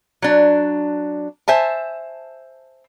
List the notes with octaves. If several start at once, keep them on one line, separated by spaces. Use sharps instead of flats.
F#3 D4
C5 E5 G#5 A5